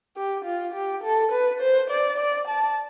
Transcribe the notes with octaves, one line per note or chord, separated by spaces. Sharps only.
G4
F4
G4
A4
B4
C5
D5
D5
A5